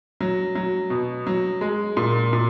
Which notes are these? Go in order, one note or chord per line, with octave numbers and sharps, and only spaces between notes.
F#3
F#3
B2
F#3
G#3
A#2
A#2